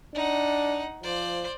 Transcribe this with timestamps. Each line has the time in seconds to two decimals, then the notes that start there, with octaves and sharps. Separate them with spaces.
0.15 D4 D#4 F#5
1.03 F3 C5 D5